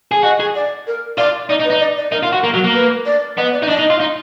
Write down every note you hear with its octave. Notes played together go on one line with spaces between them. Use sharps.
G#4
F#4 D#5
G#4
D5
A#4
F4 D5
D#4 D5
D#4
B4
D#4
D5
D5
D#4 A#4
F4
F#4
A#3
F#3
A#3
B4
D5
B3 D#5
D5
D#4
D4 D#5
D#4
F4
D#4